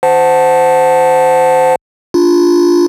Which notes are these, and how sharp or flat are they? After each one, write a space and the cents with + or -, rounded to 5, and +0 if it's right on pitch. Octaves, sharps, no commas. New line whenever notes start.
C5 -15 F#5 +0 A5 +0
D4 +0 F4 +0